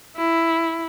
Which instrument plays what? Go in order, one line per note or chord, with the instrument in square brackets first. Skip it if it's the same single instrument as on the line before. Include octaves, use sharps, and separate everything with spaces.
[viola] E4